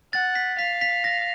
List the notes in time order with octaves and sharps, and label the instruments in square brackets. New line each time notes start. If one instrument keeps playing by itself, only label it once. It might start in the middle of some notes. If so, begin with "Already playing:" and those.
[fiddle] F#5 [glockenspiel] A6
[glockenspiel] B6
[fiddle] F5 [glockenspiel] B6
[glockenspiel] B6
A#6